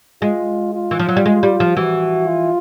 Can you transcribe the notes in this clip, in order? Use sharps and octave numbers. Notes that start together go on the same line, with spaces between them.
G#3 F4
F4
E3
F3
F#3
G3
G#3
G3
F3
E3 F#4
F4